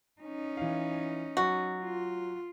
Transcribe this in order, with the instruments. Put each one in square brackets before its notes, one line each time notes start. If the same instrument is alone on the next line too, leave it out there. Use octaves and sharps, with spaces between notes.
[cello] C#4 D#4
[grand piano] E3 F5
[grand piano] F#3 [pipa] F#4
[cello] F4